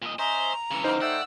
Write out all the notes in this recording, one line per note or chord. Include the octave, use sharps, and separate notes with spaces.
A#2 D#5
C#4 C5 D#5 E5 A#5
C#3 E3 C#6
F#3 D#4 A#4 C5 D6
A3 D5 F#5 G5 E6